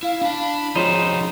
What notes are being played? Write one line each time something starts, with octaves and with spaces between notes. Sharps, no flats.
E4 F5
D4 A5 B5
F3 G#3 C4 D#4 F4 F#4 C5 C#5
C#3